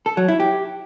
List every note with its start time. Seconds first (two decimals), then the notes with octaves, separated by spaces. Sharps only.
0.06 A4
0.17 F#3
0.28 E4
0.40 G4